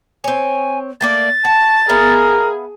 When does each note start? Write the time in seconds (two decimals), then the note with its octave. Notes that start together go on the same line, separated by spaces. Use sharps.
0.24 C4 C#5 G#5
1.01 A3 A#3 D5 A6
1.45 F#4 A5
1.89 B3 G#4 A#4 E5 F5